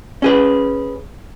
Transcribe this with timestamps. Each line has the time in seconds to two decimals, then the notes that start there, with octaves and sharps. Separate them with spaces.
0.22 C#4 G#4 B4